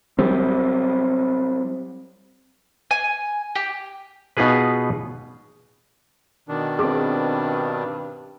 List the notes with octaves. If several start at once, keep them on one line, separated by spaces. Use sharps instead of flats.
F#3 G3 C4
G#5
G4
B2 B3 D#4 F4 G#4 B4
B2 D#3 D4
G2 C4 G#4 D6